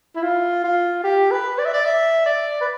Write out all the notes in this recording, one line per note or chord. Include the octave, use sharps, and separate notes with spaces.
E4
F4
F4
G4
B4
D5
E5
D5
E5
D5
B4